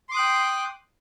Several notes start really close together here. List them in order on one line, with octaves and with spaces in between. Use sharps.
C6 D6 D#6 F#6 G5